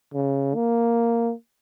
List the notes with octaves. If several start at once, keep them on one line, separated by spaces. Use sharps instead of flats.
C#3
A#3